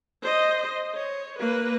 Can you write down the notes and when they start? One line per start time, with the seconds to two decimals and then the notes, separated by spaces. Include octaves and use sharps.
0.22 C5 D#5
0.95 C#5
1.39 A#3 B4